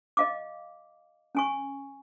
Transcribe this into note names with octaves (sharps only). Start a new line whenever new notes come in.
D#5 F5 D6
C#4 G#5 C#6